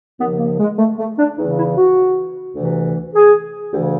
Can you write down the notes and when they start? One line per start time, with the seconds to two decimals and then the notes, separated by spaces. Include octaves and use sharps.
0.19 D#2 C#3 F3 B3
0.39 A#3
0.59 G#3
0.78 A3
0.98 A3
1.18 D4
1.37 E2 C#3 E3 D#4
1.57 E4
1.77 F#4
2.55 D2 C3 E3
3.14 G#4
3.73 D2 C#3 E3 G4